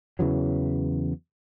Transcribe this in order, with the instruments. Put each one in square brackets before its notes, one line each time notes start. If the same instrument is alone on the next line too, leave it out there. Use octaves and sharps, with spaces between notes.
[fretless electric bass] E2 C#3 E3 F#3